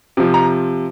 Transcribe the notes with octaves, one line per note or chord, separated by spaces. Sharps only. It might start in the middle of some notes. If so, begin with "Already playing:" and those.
C3 F3
A#5